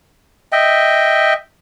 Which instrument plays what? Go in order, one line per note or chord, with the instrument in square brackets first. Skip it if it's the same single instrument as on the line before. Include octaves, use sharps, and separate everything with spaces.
[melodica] D#5 E5 G5